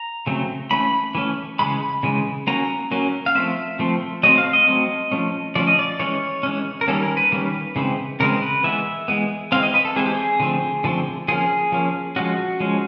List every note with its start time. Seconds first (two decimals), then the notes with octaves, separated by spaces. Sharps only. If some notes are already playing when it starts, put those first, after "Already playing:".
Already playing: A#5
0.27 C#3 F#3 A3 C4
0.71 E3 A3 C#4 B5
1.15 E3 A3 C#4
1.59 C#3 E3 G#3 B5
2.03 C#3 E3 G#3
2.47 F#3 A#3 C#4 A#5
2.91 F#3 A#3 C#4
3.26 F5
3.35 F3 A3 C4 E5
3.79 F3 A3 C4
4.23 F#3 A3 C4 D#5
4.38 F5
4.53 D#5
4.68 F#3 A3 C4
5.12 F3 A3 C#4
5.55 F3 A3 C#4 D5
5.67 D#5
5.79 D5
5.99 E3 G#3 C#4 C#5
6.43 E3 G#3 C#4
6.81 A#4
6.88 D#3 G3 A#3 C#4 A4
7.03 A#4
7.17 B4
7.32 D#3 G3 A#3 C#4
7.76 C#3 E3 G#3 C4
8.20 C#3 E3 G#3 C4 A#4
8.42 B4
8.64 E3 G#3 B3 E5
9.08 E3 G#3 B3
9.52 E3 G#3 C4 F5
9.63 D#5
9.74 B4
9.85 A4
9.96 E3 G#3 C4 G#4
10.06 G4
10.14 G#4
10.40 D3 F3 A3 C4
10.84 D3 F3 A3 C4
11.28 F3 A#3 C#4 G#4
11.72 F3 A#3 C#4
12.16 F3 G#3 C#4 F#4
12.60 F3 G#3 C#4